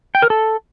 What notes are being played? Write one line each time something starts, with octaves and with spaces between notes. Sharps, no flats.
G5
A#4
A4